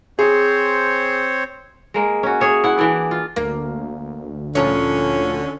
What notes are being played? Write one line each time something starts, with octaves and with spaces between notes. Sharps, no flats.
C4 G#4 C5 C#5
G#3 A#3
C#4 F#4
G#4 C#5 E5
E4 F#5
E3 D4 E4 D5
F4
D2 A#3
A#2 D3 F3 C#4 C#5